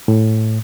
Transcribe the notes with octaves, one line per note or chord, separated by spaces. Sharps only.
A2